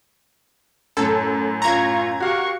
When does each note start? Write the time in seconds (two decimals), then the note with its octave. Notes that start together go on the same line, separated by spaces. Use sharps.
0.97 F#2 A2 A4
1.62 F4 A#5 C#6 G#6
2.20 F#4 G4 F5 C#6